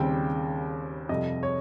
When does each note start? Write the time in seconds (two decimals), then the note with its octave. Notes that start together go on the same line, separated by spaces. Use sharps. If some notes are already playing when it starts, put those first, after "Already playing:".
Already playing: D#2 C#3 G3 C4 G5
1.09 F2 C3 G3 D#5
1.43 C#5